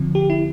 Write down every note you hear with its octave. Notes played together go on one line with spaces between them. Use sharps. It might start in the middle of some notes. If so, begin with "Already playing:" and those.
Already playing: D3 F3 C4
G4
E4